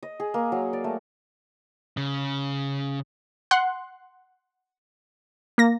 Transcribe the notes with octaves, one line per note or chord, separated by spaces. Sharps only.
D#5
G#4
A#3
F#3
D5
A3
C#3
F#5 C6 F#6
A#3 A#6